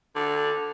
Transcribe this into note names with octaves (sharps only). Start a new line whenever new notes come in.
D3